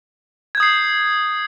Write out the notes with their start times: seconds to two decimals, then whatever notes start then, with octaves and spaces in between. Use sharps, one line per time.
0.55 G#6
0.57 G6
0.60 D#6
0.63 C7